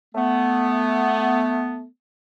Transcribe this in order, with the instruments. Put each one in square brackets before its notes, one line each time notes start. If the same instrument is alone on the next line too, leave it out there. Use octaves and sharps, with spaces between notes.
[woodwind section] A3 B3